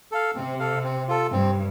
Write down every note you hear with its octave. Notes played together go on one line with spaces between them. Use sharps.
A4 F5
C3 C4
A4 F5
C4
F4 A4
G2 C4